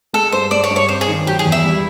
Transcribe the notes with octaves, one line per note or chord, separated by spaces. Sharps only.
G#3 A4
G2 C5
G#3 D5
C#5
G2
C#5
C4 C5
G#4
D#3
F#3 G4
G#4
E2
E4
G3